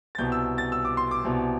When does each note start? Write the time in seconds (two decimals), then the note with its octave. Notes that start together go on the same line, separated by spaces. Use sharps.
0.15 A6
0.18 C2 B2 G6
0.32 E6
0.58 A6
0.72 E6
0.85 D6
0.97 C6
1.11 D6
1.25 C2 B2